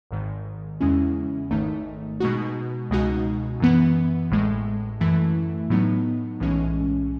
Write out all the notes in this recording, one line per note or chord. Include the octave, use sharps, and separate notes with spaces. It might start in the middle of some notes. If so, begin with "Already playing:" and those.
G#1 G#2 D#3
E2 C#3 G#3 C#4 E4
G#1 G#2 D#3 A3 D#4
B2 G#3 D#4 F#4
C#2 B2 G#3 D#4 F#4
F#2 E3 B3
A1 A2 G#3
F#2 E3 A3 E4
A2 F#3 B3 D#4
B1 A2 E3 G#3 C#4